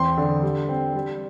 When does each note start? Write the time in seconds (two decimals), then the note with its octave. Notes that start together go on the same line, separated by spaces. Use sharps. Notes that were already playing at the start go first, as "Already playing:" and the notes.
Already playing: E2 C4 C6
0.17 D3
0.43 G3
0.68 C4
0.94 G3